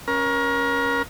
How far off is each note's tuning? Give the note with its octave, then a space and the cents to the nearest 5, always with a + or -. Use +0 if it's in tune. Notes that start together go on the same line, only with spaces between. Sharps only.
C#4 -5 A#4 +30